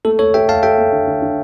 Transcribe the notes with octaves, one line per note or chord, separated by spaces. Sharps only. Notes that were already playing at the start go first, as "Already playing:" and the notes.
A3 A4
A3 A4 C#5
A4 E5 G5
A3 F5 A5
A4 E5 G5
A3
D3
D3
D3